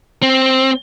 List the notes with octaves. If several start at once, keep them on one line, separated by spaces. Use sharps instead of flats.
C4